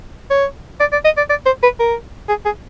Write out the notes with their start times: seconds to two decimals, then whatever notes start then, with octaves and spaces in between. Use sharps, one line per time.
0.30 C#5
0.80 D5
0.92 D5
1.05 D#5
1.17 D5
1.30 D5
1.46 C5
1.63 B4
1.79 A#4
2.29 G#4
2.45 G#4